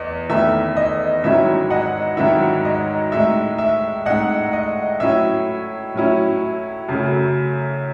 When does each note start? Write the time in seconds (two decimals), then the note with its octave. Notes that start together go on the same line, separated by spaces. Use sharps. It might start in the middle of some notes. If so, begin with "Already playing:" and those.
Already playing: E2 D#5
0.29 E2 D#3 A3 E4 E5
0.77 D#5
1.24 G#2 D#3 F#3 C#4 E4 E5
1.70 D#5 F#5
2.17 G#2 D#3 F#3 C#4 E4 E5
2.65 D#5
3.12 A2 G#3 D#4 E5
3.58 E5
4.06 A2 G#3 D#4 D#5 F#5
4.53 D#5
5.00 A2 F#3 C#4 E4 E5
5.94 A2 F#3 C#4 E4
6.89 F#2 C#3 F#3 A3